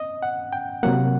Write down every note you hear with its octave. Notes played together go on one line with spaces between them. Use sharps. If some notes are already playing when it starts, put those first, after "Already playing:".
Already playing: D#5
F#5
G5
C3 F#3 A#3 F#5